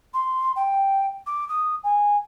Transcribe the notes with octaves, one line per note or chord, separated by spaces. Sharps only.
C6
G5
D6
D#6
G#5